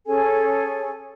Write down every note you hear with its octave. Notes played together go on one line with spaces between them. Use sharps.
C#4 G#4 A4 G#5